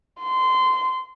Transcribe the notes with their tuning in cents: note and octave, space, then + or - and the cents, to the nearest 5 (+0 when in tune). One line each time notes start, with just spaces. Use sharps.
C6 -20